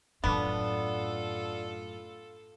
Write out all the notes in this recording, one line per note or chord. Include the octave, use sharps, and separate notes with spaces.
F#2 A2 B3 D4 F4 A4